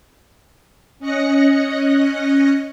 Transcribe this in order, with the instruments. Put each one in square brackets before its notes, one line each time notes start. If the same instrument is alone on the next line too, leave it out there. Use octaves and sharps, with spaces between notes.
[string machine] C#4 D#5 F#6 A#6 C#7